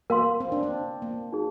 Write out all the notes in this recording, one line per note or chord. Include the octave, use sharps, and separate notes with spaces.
A#3 A#4 F5 C6
C4
D4
C4
A#3
D#4 G#4